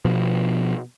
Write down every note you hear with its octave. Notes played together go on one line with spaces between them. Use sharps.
B2 F3 B3